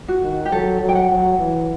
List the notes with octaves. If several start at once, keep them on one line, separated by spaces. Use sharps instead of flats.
F#4
D#3
G4
F#3 A4
F#3
G5
F#5
F#3
E3